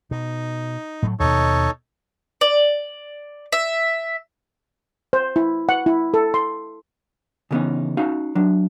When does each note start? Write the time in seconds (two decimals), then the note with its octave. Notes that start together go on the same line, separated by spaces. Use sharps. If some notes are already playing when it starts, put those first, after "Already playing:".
0.11 B2 D#4
1.02 A2 F#3 A3
1.20 D#2 B2 D#4 A4 C#5
2.41 D5
3.52 E5
5.13 C5
5.36 E4
5.69 F#5
5.86 E4
6.14 A4
6.34 C6
7.51 C#3 E3 G3 B3 C#4 D#4
7.97 C#4 D#4 F#4 F5
8.35 F#3 D4